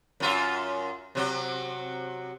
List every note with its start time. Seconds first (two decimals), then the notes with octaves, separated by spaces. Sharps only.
0.20 F#2 F4 E5
1.15 C3 F#3